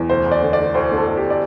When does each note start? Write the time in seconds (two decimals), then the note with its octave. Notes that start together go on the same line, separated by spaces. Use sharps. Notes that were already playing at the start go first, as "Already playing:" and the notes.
Already playing: E2
0.10 D2 C5
0.26 D2
0.32 D5
0.42 D3
0.53 D5
0.59 D3
0.74 D2 C5
0.92 D3
0.97 A4
1.07 D2
1.17 G4
1.30 D5